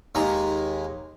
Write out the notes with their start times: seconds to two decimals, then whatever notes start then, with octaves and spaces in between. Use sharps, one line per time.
0.15 D#2 G#3 A#5